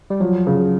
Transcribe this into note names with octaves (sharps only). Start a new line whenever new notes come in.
G3
F3 F#3
C#3